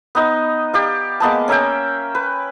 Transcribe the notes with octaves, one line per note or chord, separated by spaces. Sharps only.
B3 D#4 D#5
G4 D5 F5
G#3 A#3 B3 A5
C#4 A#4 E5 G5
B4